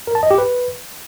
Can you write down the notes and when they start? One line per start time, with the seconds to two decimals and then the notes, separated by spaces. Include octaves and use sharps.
0.07 A#4
0.15 A5
0.23 D#5
0.31 G4
0.38 B4